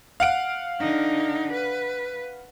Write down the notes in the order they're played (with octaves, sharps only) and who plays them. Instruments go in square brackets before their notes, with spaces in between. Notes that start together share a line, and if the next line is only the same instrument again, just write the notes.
[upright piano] F5 F#5 D7
[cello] D3 D#4
B4